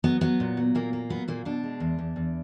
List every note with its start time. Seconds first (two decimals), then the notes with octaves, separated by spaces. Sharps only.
0.04 F#3 B3
0.21 F#3 B3
0.40 A#2
0.57 F#3
0.75 A#2 A#3
0.93 A#3
1.10 F#3 B3
1.28 A#2 A#3
1.45 B2 D4
1.63 G#3
1.80 E2
1.98 E2
2.16 E2